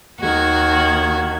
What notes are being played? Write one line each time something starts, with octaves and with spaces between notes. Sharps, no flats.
D#2 D#3 F#4 G#6